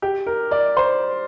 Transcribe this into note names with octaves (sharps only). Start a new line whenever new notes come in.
G4
A#4
D5
C5